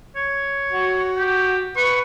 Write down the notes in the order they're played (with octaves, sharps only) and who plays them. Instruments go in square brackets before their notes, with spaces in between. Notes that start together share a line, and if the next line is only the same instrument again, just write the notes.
[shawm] C#5
[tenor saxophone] F#4
[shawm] G4
[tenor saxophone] B4 [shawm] C#6